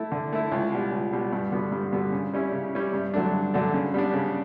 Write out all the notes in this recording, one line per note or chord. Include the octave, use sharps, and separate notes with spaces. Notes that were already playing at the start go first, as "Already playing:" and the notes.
Already playing: A3 E4
D3
A3 E4
C#2
B2 G3
C#2
B2 G3
G2
D3 G3 B3 F#4
G2
D3 G3 B3 F#4
C#3
G3 C#4 E4
C#3
G3 C#4 E4
G2
D3 F#3 A3 D4
G2
D3 F#3 A3 D4
C#3
G3 B3 D4
C#3